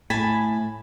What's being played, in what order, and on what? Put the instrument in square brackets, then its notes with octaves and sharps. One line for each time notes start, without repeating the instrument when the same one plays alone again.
[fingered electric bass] A2 [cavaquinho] G#5 A5 B5